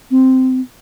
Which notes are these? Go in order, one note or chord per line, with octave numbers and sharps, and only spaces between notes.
C4